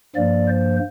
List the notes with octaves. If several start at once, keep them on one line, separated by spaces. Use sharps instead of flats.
G2 F3 A#3 D5
C5